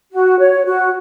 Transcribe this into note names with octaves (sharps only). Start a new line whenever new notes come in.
F#4
C#5
F#4